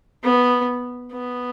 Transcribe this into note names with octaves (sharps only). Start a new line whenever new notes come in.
B3
B3